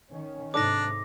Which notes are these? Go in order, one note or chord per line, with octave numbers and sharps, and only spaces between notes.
D#3 C#4
G#2 C3 D4 D#4 A4 D5 D6 A#6